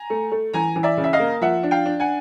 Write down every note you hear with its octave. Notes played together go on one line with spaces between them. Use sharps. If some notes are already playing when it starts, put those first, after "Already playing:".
Already playing: G#5 A#5
A3
A3
E3 G#5 A#5
E3
D5 E5
C#3
E5
D#5 F5
A#3
F3 E5 F#5
D4
F5 G5
D4
F#5 G#5